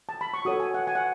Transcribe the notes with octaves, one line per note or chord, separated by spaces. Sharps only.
A5
B5
C#6
F#4 A4 C#5 D#6
G#5
F#5
G#5
F#5